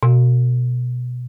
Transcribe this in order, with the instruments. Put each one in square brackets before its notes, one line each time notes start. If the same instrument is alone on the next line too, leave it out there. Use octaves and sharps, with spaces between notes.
[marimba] B2